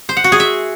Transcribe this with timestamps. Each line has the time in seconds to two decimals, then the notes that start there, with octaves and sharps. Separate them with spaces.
0.09 C5
0.17 F#5
0.24 F#4
0.32 G#4
0.40 E5